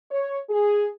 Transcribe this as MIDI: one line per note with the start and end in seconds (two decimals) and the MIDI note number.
0.11 0.39 73
0.50 0.89 68